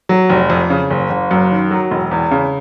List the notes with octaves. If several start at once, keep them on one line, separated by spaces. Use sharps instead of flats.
F#3
F1
F2
C#3
F#1
F#1
F#2
D#3
F#3
E1
E2
C#3